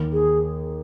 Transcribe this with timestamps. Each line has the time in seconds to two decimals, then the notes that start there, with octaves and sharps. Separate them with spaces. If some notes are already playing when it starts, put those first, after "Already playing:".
Already playing: D#2
0.13 G#4